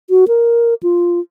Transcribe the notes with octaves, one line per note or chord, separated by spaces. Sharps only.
F#4
A#4
F4